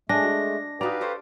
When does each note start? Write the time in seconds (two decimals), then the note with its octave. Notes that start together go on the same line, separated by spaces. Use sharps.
0.09 G#3 A3 D4 G#5 A#6
0.23 F#4
0.81 D#4 F#4 G4 B4 D5 F5 A#5
1.01 A4 C5 C#5